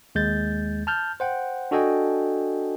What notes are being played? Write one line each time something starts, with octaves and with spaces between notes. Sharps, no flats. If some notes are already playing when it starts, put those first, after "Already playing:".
D#2 G#3 G6 A6
A5 F6 G6
C5 F#5 G5
D4 F#4 A4 D#5 G5 G#5